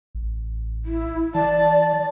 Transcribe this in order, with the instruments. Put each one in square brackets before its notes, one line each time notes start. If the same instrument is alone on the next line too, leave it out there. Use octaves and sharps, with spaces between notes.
[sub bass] A1
[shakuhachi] E4
[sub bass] E3 [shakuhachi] D5 [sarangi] A5